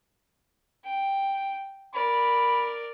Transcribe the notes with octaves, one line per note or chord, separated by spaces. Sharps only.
G5
A#4 D5 B5